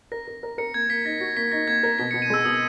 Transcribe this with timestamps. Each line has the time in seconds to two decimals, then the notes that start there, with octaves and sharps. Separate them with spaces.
0.12 A#4 A#6
0.28 A#4
0.43 A#4
0.58 A#4 C#7
0.74 A#3 G#6
0.89 A#3 B6
1.05 D#4 A#6
1.20 F#4 A#6
1.37 A#3 B6
1.52 D#4 A#6
1.68 A#3 G#6
1.83 A#4 A#6
1.99 B2 B6
2.11 C#7
2.14 B2
2.22 D#7
2.30 G#3 E6
2.45 B2 D#6